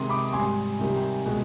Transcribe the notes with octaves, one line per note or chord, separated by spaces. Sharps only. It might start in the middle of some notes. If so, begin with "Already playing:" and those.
Already playing: C3 D#3 G#3 C6 D#6
B5 D6
G#2 G3 G#5 C6
C3 D#3 G3
B2 G#3